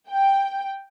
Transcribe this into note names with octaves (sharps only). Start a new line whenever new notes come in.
G5